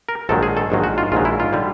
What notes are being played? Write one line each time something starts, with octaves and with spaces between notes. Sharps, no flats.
A#4
A#1 G#2 D#3 F#3 A4
G#4
A4
A#1 G#2 D#3 F#3
F#4
F4
A#1 G#2 D#3 F#3 F4
E4
F4
D3 G3